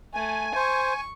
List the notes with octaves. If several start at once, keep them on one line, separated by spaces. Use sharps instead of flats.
A3 G#5
C5 C#6